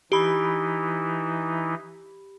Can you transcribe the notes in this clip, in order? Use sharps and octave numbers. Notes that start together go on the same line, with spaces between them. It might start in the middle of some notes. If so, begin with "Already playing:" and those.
E3 D#4 E4 G4 B5